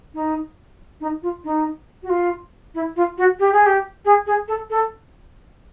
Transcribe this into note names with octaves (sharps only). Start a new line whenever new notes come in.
D#4
D#4
F4
D#4
F#4
F4
E4
F4
F#4
G4
G#4
G4
G#4
G#4
A4
A4